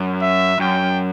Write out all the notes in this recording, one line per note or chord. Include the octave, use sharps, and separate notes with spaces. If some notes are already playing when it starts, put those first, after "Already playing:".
Already playing: F#2
E5
F#2 G5